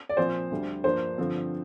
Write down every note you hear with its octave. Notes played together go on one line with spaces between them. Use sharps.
D5
A#2 F3 C4 C5
D2 D3 G3
G2 F3 A#3 D4 C5
G2 D3 F3 C4